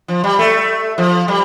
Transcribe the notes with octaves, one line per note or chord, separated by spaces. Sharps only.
F3
G3
A3
F3
G3